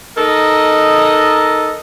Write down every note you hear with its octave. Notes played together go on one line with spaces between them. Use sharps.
D#4 A4 A#4 D#5